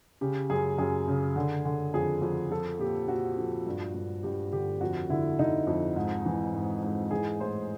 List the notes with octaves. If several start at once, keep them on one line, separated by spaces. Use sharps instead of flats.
C#3 G4
F#2 G#4
F#2 G#4
C#3
D3
D3
F2 G#4
F2
F3 A4
A#2 G4
A#2 F#4
F3
G2
G2
G2 G4
D3 G4
F2 F#4
D3 E4
D3 D#4
F2
G#2
E3
G#2
G#2
E3 G#4
A2 C5